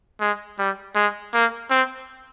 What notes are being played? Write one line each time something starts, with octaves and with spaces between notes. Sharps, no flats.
G#3
G3
G#3
A#3
C4